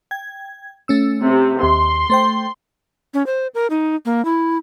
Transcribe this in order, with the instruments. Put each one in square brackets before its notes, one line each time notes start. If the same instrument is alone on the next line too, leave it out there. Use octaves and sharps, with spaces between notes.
[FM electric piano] G5 G#6
A3 C#4 E6
[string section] C3
[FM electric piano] D#2 [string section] C6
[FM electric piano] A3 C5 G5
[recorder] C#4
C5
A#4
D#4
A#3
E4